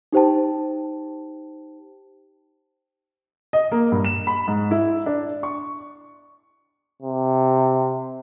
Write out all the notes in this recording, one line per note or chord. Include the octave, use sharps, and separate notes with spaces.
D#4 G4 C5 G5 A5
D#5
A#3
G2
E7
B5
G#2
E4
D4
C#6
C3